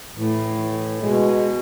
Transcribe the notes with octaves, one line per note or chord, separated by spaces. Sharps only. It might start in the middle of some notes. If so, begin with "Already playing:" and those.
A2 E3
E3
B2 G#3